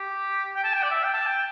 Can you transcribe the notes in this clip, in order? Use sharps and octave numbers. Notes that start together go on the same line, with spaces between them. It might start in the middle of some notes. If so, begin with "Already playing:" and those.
Already playing: G4
G5
A5
G5
D5
E5
G5
A5
G5